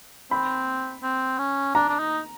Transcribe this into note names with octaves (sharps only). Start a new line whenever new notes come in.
C4 B5
C4
C#4
D4 A#5
D4
D#4